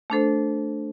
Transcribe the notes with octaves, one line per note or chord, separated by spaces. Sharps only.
A3 D4 A4 C5